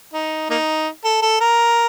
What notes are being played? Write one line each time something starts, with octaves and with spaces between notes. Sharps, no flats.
D#4
A#3 D#4
A4
A4
A#4